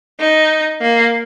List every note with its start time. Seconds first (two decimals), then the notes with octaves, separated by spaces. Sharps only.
0.20 D#4
0.81 A#3